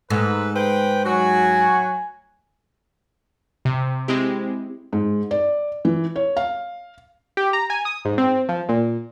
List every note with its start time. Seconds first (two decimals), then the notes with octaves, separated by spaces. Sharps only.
0.10 G#2 A4 B4
0.55 B4 C5 G5
1.05 F#3 F#4 G#5
3.65 C3
4.08 G#3 C4 E4 G4
4.93 G#2
5.31 D5
5.85 E3
6.16 C#5
6.37 F5
7.37 G4
7.53 A#5
7.70 G#5
7.85 D#6
8.05 G#2
8.18 C4
8.49 F3
8.69 A#2